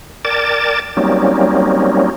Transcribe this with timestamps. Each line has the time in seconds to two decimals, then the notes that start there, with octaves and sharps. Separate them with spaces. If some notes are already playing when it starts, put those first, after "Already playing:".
0.25 A#4 D5 G5 A5 D6 A6
0.97 F#3 G3 A#3 C4 C#4 D#4